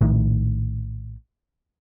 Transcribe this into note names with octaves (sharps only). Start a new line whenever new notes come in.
A#1 A2 D#3